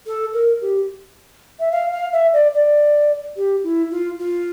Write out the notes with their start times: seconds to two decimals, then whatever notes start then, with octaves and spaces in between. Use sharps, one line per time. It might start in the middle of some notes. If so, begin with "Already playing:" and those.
0.06 A4
0.33 A#4
0.61 G4
1.59 E5
1.71 F5
1.91 F5
2.12 E5
2.33 D5
2.54 D5
3.36 G4
3.63 E4
3.91 F4
4.19 F4